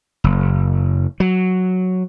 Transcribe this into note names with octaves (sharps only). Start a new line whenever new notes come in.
F#1
F#3